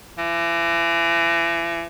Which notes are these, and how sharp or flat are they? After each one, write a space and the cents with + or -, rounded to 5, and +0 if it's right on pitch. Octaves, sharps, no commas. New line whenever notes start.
E3 +35